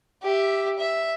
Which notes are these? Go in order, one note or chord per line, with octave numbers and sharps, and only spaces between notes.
G4 E5
E5